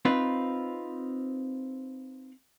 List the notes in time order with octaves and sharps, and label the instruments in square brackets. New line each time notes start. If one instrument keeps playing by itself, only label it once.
[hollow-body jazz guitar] C4 D#4 F4 B4